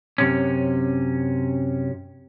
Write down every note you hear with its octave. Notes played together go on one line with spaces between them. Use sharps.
F#2 C3 C#4